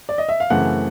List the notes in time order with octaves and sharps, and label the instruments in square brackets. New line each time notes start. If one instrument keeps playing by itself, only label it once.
[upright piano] D5
D#5
E5
F5
F#2 C#3 E3 A3 C4 F#5